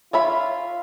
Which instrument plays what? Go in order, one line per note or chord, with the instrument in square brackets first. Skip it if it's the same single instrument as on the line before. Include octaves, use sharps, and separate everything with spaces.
[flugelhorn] F4 [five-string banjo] C#5 E5 B5